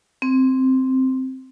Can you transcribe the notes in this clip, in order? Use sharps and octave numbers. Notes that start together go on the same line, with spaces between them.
C4